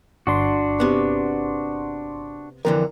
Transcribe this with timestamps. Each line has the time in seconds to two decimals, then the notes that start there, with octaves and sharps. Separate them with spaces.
0.27 G1 D4 F#4 C6
0.80 C3 B3
2.65 F2 D3 E3 A#4